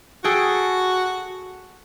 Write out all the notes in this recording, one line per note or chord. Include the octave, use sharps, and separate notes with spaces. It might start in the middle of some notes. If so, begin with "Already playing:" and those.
F#4 G#4 A4 G5